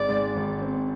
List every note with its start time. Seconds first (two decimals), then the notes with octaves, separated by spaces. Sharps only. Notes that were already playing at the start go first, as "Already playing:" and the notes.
Already playing: G#1 G#3 C4 D5
0.09 G#2
0.36 G#1
0.62 C4